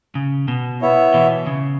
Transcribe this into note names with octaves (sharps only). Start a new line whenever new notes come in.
C#3
B2
B3 E4 C#5 E5
B2 E3
C#3